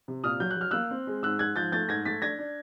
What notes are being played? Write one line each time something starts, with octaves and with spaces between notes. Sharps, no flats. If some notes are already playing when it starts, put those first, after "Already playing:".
C3
A#2 D#6 F6
F#3 G6
F#6
F#3 F6
A#3 E6 F#6
C4
G#3
G#2 E6 F#6
G#2 F#6 G#6
F3 G6 A6
A3 G6 A6
G#2 G#6 A#6
A3 A6 B6
D4 G#6 A#6
D4